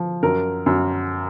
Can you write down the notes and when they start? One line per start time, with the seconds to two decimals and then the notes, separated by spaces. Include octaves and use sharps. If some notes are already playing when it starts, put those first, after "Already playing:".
Already playing: F3
0.23 F#2 A#4
0.66 F#2